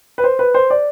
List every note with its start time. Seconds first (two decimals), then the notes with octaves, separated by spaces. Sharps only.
0.18 B4
0.24 C5
0.39 B4
0.54 C5
0.70 D5